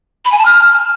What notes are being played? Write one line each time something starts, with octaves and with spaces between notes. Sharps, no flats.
B5
G#5
A5
F6